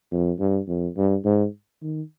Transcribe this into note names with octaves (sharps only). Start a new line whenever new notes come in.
F2
G2
F2
G2
G#2
D#3